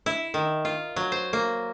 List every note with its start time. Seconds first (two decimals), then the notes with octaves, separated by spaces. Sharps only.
0.06 E4
0.34 D#3
0.65 F4
0.96 F#3
1.12 C5
1.33 A#3